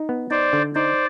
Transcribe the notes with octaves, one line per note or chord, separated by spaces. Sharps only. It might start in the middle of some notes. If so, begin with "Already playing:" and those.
Already playing: D#4
B3
D#4 C5 D5
D3
D#4 C5 D5